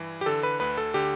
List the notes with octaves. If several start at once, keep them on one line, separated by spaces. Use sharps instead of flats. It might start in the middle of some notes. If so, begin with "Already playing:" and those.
Already playing: G2 E3
G4
D3 A4
B4
D2 B4
A4
D3 G4